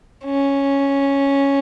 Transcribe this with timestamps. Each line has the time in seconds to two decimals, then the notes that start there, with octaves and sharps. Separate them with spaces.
0.24 C#4